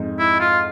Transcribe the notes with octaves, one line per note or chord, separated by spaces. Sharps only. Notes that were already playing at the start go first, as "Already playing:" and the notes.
Already playing: F2 G#2
E4
F4